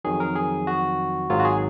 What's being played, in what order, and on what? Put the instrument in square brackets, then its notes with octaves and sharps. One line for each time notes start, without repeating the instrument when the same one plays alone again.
[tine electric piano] F2 D#3 F#3 G#4
A#4
G#4
F#4
G#1 G#2 D#3 F#3 F4
F#4
G#4